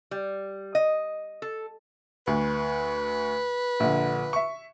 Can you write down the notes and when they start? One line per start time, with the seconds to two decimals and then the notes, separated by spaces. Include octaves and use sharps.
0.11 G3
0.75 D#5
1.42 A4
2.27 D2 B4
3.80 A#1 D3
4.33 E5 C#6